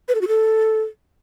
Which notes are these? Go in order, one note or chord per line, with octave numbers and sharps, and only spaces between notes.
B4
A4
F#4
A4